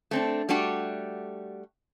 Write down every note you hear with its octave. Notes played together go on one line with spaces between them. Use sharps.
A3 C4 D4
G3 A3 D4 F#4 G4